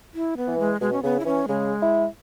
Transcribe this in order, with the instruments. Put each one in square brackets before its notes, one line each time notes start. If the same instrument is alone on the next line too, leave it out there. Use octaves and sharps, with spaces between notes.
[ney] E4
B3
[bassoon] E3
[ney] G#3
[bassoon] B2 [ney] G#3
[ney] C#4
[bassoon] C#3 [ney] B3
[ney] E4
[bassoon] E3 [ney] C#4
[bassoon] C#3 [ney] G#3
[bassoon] E4